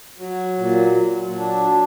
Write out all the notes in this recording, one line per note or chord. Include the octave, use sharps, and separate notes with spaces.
F#3
A#2
F#3
D4